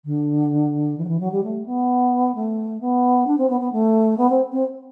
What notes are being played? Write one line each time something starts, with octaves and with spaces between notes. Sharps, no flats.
D3
E3
F#3
E3
F#3
G3
A3
B3
A3
B3
D4
C4
B3
B3
A3
B3
C4
C4